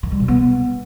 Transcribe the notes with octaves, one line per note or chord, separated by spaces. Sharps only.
D#3
G3
B2
B3